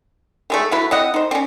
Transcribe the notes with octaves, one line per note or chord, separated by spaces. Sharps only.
D#3 G#3 A3
F#3 A3 E4 B4
C4 E4 D#5 F#5
D#4 C5
C4 C#4